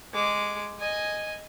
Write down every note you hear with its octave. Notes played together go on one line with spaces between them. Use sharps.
G#3 D6
D#5 G#5